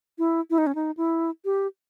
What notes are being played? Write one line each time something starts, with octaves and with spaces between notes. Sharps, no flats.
E4
E4
D#4
C#4
D#4
E4
G4